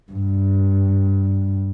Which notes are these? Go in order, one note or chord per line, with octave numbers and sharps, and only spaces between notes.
G2